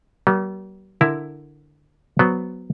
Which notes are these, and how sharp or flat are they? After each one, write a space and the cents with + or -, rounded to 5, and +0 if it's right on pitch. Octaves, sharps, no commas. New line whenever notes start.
G3 -45 A#3 +40
D3 +10 E4 +0 A#4 +0
F#3 +0 B3 +0 C5 +0